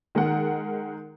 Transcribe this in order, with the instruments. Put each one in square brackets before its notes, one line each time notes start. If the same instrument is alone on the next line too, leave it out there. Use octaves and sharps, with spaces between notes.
[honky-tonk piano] D#3 G#3 A#4 F#5